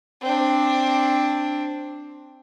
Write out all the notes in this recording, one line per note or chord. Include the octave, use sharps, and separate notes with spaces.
C4 D4